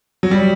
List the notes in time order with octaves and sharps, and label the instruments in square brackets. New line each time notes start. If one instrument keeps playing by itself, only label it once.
[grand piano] F#3
G3